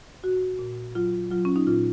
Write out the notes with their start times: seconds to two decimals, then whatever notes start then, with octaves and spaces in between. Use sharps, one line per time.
0.24 A#2 F#4
0.59 A#2
0.95 F#3 F4
1.30 F#3 F4
1.45 C#4
1.56 D#4
1.67 A#2 F4